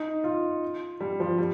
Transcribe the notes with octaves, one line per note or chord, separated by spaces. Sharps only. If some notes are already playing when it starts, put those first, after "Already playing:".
Already playing: D#4
F4
G3
F3
G3